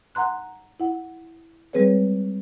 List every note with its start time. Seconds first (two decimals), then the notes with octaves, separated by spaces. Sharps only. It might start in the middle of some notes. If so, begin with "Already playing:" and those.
0.15 F#5 A#5 C6 F#6
0.80 E4 F#5
1.73 G3 G#3 C4 G#4 B4 C#5